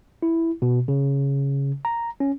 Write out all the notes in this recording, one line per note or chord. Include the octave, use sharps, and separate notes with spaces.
E4
B2
C#3
A#5
C#4